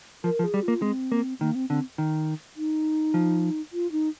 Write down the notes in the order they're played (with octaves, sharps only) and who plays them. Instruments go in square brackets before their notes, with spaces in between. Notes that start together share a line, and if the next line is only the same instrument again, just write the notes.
[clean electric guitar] F3 [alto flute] A#4
[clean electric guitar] F3
[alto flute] G#4
[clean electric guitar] G3
[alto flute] F4
[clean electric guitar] A#3
[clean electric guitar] G#3 [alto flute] C4
[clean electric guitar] A#3
[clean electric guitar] D#3 [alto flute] A#3
[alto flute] C4
[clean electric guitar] D3 [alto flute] C4
[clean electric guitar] D#3
[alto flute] D#4
[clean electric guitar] F3
[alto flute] F4
D#4